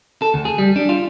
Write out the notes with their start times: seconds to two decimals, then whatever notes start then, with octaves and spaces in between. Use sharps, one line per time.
0.22 A4
0.34 D2
0.45 G#4
0.58 G3
0.76 D4
0.89 F4